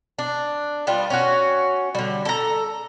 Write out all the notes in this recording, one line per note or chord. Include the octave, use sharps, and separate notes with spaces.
D4
G3 B3 F4
C#4 F#4
D3 G3
A4 A#5